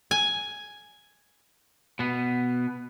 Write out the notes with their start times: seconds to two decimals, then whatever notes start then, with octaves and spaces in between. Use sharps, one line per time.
0.11 G#5
1.99 B2 B3